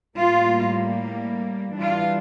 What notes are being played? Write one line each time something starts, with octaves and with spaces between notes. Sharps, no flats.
A2 G3 A#3 F4
E3 G3 D4 F4